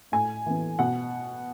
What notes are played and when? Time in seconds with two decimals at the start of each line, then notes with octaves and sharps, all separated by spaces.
0.12 A2 G#5
0.46 E3 B3
0.79 B2 F#5